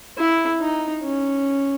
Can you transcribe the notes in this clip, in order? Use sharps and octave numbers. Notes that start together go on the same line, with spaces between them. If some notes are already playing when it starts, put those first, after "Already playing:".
E4
D#4
C#4